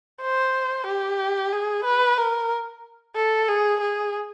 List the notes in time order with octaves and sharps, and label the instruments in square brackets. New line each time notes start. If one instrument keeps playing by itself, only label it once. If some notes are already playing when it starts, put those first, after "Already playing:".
[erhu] C5
G4
G#4
B4
A#4
A4
G#4
G#4